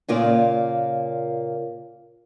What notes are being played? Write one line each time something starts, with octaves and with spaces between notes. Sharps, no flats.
A#2 C#3 A#3 F4 C#5 D5